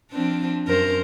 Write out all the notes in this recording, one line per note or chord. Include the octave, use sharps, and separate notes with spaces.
F3 C4 D4
F#2 A#4 C5